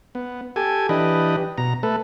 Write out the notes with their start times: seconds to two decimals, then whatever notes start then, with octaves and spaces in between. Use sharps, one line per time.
0.15 B3
0.56 G4 A4 G#5
0.89 E3 D4 G4 B4 D#5
1.58 B2 A#5
1.83 A3 A4 B4